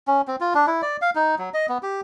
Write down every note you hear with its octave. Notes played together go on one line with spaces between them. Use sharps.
C#4
C4
F4
D4
E4
D5
F5
D#4
F#3
D#5
B3
G4